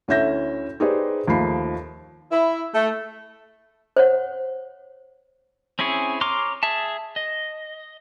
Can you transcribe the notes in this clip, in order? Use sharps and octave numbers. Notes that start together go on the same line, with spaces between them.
D2 C#4 E4 E5 G6 A#6
D#4 G4 G#4 B4 C5 D5
D#2 F3 A3 D#4 B5 C7
E4
A3
C5 C#5 F#5
C4 C#4 E4 G#4 C#5
C#5 A#5 C6 D6 F6
G#4 E5 A5
D#5